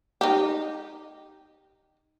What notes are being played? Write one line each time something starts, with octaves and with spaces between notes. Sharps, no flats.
D#4 G4